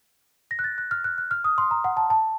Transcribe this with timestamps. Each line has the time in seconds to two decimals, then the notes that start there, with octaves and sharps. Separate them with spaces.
0.51 A#6
0.59 F#6
0.64 A6
0.78 F#6
0.91 F6
1.04 F#6
1.18 F#6
1.31 F6
1.44 D#6
1.58 C6
1.71 A#5
1.84 F#5
1.97 A5
2.10 A5